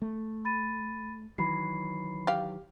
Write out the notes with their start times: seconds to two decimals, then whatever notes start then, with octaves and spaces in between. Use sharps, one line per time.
0.02 A3
0.45 B5 A6 D#7
1.38 D#3 E3 F#3 B5 C7
2.27 G4 F5